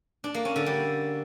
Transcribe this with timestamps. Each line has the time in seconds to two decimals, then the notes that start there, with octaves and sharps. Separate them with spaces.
0.24 D4
0.34 A#3
0.45 C#4
0.56 D3
0.66 G3